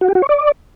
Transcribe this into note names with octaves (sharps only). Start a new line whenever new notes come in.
F#4
G4
F#4
C#5
D5